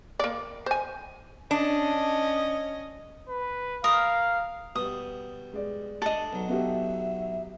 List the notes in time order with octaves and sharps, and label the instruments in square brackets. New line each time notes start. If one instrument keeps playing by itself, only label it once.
[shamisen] A#3 D5
C5 G#5
[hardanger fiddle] C#4 D#5 [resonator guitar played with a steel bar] D4
[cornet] B4
[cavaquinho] A#4 D#6 [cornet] F5
[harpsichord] B2 G3 [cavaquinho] D#6
[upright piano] G#3 D5
[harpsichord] D4 G#4 [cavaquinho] A4 D#5
[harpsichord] B1 F#3
[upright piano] B3 F#4 G4 [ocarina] E5